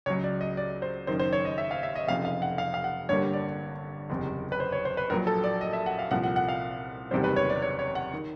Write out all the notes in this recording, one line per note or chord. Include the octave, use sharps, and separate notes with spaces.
C#2 C#3 F#3 C#5
D5
D#5
D5
C5
F#1 F#2 D#3 C5
C5
C#5
D#5
E5
F5
E5
D#5
F1 F2 C#3 F5
F5
F#5
F5
F5
F#5
G1 G2 D3 G3 A#3 C#5
D5
F#1 E2 C3
B4
C5
C#5
C5
B4
A#1 A#2 F#3 A#4
A4
D5
D#5
E5
F#5
F5
C2 A#2 F3 F#5
F#5
F#5
F5
F#1 E2 C3 D#3 G3 C5
B4
C#5
D5
C#5
C#5
F#5
D#3